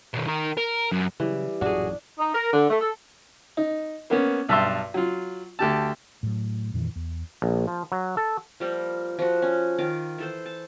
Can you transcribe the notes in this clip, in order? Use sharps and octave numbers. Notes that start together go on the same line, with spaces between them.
B2 D#3
D#3 A#4
A#4
F#2
C#3 E3 F#3 G3
A1 F#2 A#2 D4 F#4 G#4
D#4
A#4
D3
A3
A4
D#4
A#3 B3 C#4
B1 G2 E5 A5 C6
F#3 F4
D2 G4 A5
A2 F#3
F2 A#2 D#3 E3
E2
A#1
F3
F#3
A4
F3 G3 A#3
F3 F#4
C#4
D#3 F4 D6
E3 A4 C5
A5